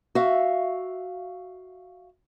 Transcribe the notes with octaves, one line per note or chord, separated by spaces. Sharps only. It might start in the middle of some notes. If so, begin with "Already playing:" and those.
F#4 E5 F5